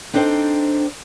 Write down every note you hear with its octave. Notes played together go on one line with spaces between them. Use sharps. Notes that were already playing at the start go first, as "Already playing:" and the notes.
C4 D4 D#4 A4 C5 G5